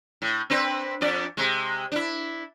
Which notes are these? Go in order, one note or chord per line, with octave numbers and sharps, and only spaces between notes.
A2
C4 D4 B4
F2 D4 D5
C3 G#3
D4 E4